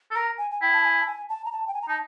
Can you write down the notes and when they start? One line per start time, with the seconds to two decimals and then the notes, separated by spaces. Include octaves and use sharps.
0.11 A4
0.15 A#4 A#5
0.38 G#5
0.51 G#5
0.62 E4 G5
0.73 A5
0.84 G#5
1.01 A5
1.07 G#5
1.29 A5
1.45 A#5
1.52 A5
1.67 G5
1.74 G#5
1.82 A#5
1.88 D#4 A5